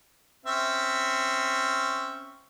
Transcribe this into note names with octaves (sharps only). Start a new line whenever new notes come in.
C4 C#4 E5